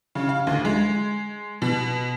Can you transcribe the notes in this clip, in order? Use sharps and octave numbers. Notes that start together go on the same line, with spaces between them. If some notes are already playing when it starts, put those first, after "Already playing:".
C#3
F5
D2
G#3
B2